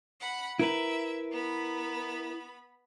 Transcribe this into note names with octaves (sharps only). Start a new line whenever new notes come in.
F#5 B5
E4 A#4 B4 E5
B3 B5